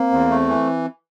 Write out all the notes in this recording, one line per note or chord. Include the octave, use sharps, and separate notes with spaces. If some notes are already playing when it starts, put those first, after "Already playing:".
Already playing: A#3 C4
E2
A3
E3